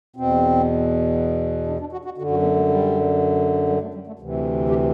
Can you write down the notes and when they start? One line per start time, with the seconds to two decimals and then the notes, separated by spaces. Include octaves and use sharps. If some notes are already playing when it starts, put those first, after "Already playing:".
0.16 E2 B2 C4
1.67 D4
1.80 D4
1.92 F#4
2.05 F#4
2.18 F#2 D3 F#4
2.31 F#4
2.42 B3
2.56 A3
2.68 G3
3.69 G3
3.82 A3
3.94 G3
4.07 A3
4.19 D2 C3 E3
4.69 G4